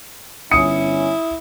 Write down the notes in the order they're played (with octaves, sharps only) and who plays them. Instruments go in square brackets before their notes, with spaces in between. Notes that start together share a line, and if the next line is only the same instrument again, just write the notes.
[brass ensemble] G1 C#4 [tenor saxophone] E4 [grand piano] D#6 C#7